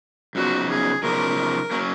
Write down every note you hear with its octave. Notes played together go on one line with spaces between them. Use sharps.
F#2 C#3 F3 B3 D#4 F#4
G#4
F#2 C#3 F3 B3 D#4 A#4
F#3 A#3 C#4